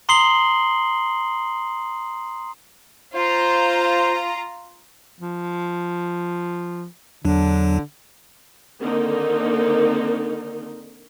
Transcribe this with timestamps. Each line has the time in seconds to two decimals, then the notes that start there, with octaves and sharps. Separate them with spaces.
0.09 A#5 C6 D#6 C7 F#7 G7
3.15 F4 C5 A#5
5.21 F3
7.25 E2 D3 F#3 D4
8.81 D3 D#3 A#3 C4 D#4 A#4